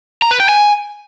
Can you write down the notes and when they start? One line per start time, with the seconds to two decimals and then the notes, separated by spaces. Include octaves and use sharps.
0.22 A#5
0.31 B4
0.40 G5
0.49 G#5